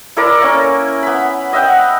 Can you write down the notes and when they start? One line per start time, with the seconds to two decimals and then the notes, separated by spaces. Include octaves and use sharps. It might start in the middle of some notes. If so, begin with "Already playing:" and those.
0.17 E4 A4 A#4 D5
0.42 A#3 C#4
1.03 B3 B5
1.53 D#5 E5 F#5 G5